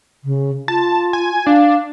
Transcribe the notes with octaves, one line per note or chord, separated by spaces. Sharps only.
C#3
F4 A5
G#5
D4 F5